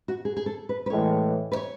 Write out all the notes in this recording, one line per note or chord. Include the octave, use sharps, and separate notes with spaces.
F#4
G#4
G#4
A4
B4
B4
A2 E3 G#3 C#5
B4
C#5